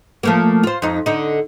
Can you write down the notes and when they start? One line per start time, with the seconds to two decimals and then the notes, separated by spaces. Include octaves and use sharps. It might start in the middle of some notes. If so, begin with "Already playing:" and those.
0.23 F3 A3 A#3
0.63 F4 C5
0.82 F2 D#4
1.06 D3 D#4